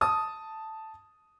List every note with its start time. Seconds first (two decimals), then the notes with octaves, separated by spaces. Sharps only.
0.01 A5 D#6